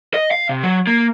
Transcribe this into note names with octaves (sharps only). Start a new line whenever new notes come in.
D#5
F5
C3
F#3
A#3